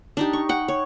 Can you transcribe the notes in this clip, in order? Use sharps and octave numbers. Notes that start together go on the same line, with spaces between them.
D4 D#4 G4
C#6
F#5 G5
C#5